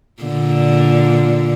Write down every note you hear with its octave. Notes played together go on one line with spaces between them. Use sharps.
A#2 D3